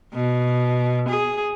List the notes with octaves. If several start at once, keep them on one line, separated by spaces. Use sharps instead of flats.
B2
G#4